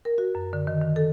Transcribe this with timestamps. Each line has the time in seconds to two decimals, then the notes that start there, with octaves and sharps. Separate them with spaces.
0.05 A#4
0.18 F#4
0.35 F#2
0.53 D3
0.67 D#3
0.81 D#3
0.96 A4